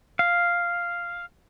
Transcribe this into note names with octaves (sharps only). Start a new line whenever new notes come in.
F5